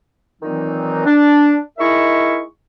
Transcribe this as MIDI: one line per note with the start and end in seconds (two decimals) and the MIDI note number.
0.42 1.05 46
0.42 1.05 51
0.42 1.05 52
0.42 1.05 54
0.42 1.05 60
0.42 1.05 63
1.06 1.57 62
1.79 2.41 56
1.79 2.41 63
1.79 2.41 64
1.79 2.41 70
1.79 2.41 76
1.79 2.41 85